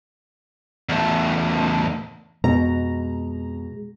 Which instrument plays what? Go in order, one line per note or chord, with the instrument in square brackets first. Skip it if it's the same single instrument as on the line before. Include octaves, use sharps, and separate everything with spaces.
[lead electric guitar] E2 A3
[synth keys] F2 B2 A#5 [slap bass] G#3